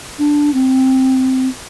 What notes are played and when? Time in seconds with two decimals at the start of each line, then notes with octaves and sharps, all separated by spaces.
0.19 D4
0.54 C4